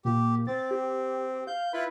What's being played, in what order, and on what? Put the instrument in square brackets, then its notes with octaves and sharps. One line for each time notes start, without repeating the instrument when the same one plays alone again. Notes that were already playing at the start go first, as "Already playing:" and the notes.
[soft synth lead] A#2 [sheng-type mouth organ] G4
[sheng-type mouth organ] C4 [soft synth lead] A6
[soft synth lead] G4
[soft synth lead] F5 [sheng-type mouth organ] G6
[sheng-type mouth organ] E4 F4 B4 [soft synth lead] B5